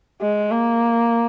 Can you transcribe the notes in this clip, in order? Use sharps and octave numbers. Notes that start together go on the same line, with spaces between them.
G#3
A#3